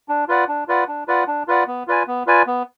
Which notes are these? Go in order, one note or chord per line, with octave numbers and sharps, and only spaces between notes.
D4
F4 B4 D5 F#5
D4
F4 B4 D5 F#5
D4
F4 B4 D5 F#5
D4
F4 B4 D5 F#5
B3
F4 B4 D5 G#5
B3
F4 B4 D5 G#5
B3